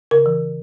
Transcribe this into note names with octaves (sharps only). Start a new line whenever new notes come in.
C#3 A#4
E3